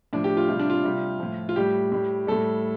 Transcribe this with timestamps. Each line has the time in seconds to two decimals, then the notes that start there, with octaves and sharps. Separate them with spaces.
0.13 A2 F3 D4
0.24 G4
0.37 F4
0.49 C3 G3 F4
0.59 D4
0.70 F4
0.84 C3 G3
1.20 A2 F3
1.49 F4
1.56 A2 G3 G4
1.92 A2 G3
2.27 A2 G3 A4